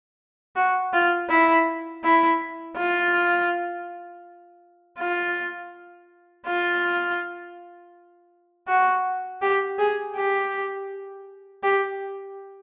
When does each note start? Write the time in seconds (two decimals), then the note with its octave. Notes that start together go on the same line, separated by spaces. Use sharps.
0.56 F#4
0.93 F4
1.29 E4
2.04 E4
2.77 F4
4.99 F4
6.47 F4
8.68 F#4
9.42 G4
9.79 G#4
10.16 G4
11.63 G4